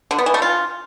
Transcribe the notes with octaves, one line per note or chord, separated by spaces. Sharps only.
D3
B3
E3
A3
F4